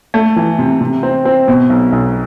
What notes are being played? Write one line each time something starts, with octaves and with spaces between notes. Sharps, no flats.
A3
E3
C3
C3
C4
C4
B2
B1
B1